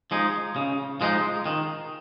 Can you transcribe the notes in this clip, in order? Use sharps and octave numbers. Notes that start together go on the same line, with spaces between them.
F3 G#3 D#4
C#3
F3 G#3 D#4
D#3